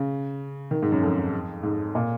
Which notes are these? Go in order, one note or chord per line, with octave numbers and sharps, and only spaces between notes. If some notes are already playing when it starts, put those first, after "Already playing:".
Already playing: C#3
D#3
G#2
F#2
F2
G#2
A#2